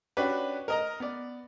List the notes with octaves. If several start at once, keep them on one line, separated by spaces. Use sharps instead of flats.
C#4 D4 F#4 G4 B4
A#4 D#5 A#5
B3 D5